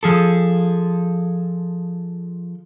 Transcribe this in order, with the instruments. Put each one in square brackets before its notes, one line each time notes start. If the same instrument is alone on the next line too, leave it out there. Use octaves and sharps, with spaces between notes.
[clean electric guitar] F3 G#4 A4